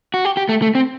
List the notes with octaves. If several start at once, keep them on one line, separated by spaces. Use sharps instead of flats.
F#4
G4
G4
A3
A3
C4